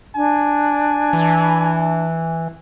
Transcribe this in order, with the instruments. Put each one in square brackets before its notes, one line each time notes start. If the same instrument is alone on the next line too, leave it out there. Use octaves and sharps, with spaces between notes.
[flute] D4 [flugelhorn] G#5
[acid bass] E3